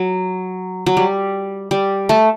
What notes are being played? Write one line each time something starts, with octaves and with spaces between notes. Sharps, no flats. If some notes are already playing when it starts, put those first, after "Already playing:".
Already playing: F#3
F#3
G3
G3
A3